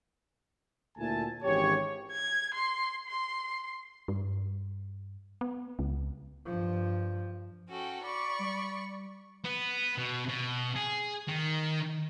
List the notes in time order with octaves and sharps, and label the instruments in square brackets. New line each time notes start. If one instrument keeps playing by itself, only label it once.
[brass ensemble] D2 A#2 A3 E4 G#5 A5
G#1 E3 C#4 G4 C#5
[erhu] G#6
C6
C6
[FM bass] G2
B3
C#2
[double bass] G2 F3
[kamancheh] C#4 G5 [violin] F#4 A4
[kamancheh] D5 B5 [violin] C#6 [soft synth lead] D6
[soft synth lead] G3
[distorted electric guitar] B3
B2
B2
G#4
D#3